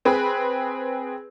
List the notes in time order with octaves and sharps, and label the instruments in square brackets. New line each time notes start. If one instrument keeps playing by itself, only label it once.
[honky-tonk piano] C4 G#4 B4